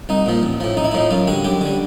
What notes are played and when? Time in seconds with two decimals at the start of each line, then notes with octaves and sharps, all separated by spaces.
0.09 C2 D#4
0.26 A#2 F3
0.43 A1
0.60 A2 F3
0.77 A1 D#4
0.84 E4
0.91 A2 F3 D#4
1.11 F#2 F4
1.28 D3 G3 F#4
1.44 F#2 G4
1.61 D3 G3